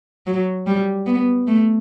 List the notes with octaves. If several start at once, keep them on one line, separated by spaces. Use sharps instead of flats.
F#3
G3
B3
A3